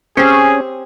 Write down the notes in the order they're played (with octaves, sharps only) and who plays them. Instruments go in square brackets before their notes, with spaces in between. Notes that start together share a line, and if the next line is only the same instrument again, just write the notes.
[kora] C4 G4 C5 [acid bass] C#4 [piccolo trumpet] G#4